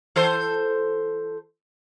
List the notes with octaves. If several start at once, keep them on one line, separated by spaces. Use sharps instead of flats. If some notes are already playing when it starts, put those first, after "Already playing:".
E3 A4 C5